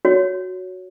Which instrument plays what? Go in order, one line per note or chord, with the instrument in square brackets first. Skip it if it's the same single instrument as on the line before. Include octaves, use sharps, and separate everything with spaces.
[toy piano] F#4 C#5